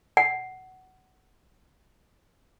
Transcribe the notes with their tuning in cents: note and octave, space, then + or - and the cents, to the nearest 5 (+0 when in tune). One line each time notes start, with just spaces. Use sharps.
F#5 +15